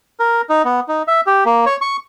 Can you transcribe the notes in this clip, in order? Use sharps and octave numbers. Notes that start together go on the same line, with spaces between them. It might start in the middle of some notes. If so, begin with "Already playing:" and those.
A#4
D#4
B3
D#4
E5
G4
A#3
C#5
C#6